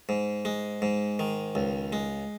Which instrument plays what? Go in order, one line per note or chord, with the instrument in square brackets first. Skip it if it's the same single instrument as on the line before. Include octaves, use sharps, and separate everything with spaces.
[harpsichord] G#2
G#3
G#2
D#3
C#2
G#3